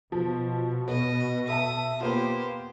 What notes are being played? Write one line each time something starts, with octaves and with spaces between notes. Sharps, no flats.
B2 F3
B3 D#5
A4 E5 A5 D#6
A#3 B3 F4 G4 C5